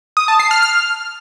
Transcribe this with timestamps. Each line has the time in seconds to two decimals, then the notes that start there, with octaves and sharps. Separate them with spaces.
0.17 D#6
0.28 A5
0.40 C7
0.51 F6
0.62 F6